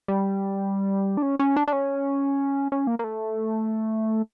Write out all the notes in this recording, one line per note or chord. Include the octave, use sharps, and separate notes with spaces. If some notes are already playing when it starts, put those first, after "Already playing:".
G3
D4
C#4
C#4
D4
D4
C#4
C#4
A#3
A#3
A3